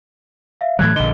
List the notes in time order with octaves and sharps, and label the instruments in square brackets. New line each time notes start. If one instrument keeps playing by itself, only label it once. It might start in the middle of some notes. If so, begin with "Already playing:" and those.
[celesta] E5 F5
[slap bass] A2 E3 F#3 [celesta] F#6 G#6
[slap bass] A#1 D3 [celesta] D#5 G7